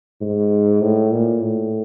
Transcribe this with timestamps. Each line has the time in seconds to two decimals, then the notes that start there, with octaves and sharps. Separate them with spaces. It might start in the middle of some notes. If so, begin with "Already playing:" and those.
0.21 G#2
0.82 A2
1.11 A#2
1.41 A2